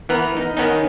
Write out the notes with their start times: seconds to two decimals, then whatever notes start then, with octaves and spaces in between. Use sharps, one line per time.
0.09 E3 B3 A#4 B4
0.37 D#4
0.57 D#3 B3 C#4 D#4